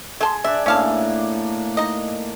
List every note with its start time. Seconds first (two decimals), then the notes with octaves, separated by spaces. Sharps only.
0.21 A3 G#4 A5 C6
0.44 D4 D5 E5
0.66 A2 A#3 C#4 F5 A5
1.77 D#4 D#5